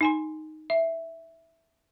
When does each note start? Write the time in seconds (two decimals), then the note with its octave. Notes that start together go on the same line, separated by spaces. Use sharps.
0.01 D#4 G#5 C6
0.70 E5